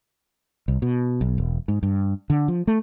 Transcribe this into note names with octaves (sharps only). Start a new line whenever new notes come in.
C2
B2
B1
E1
G#2
G2
D3
F3
A3